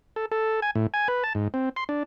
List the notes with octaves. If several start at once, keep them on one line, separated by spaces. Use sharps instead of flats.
A4
A4
G#5
A2
G#5
B4
A5
G#2
C4
C6
D4